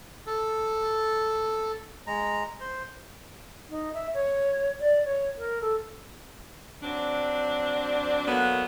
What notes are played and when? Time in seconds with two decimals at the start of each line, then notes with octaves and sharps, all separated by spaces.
0.27 A4
2.07 G#3 A#5
2.60 C5
3.70 D#4
3.94 E5
4.14 C#5
4.80 D5
5.05 C#5
5.38 A#4
5.61 A4
6.83 F#3 C4 D4
8.27 D3 F#3 A#3 B3